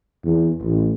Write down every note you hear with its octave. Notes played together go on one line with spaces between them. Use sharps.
E2
A1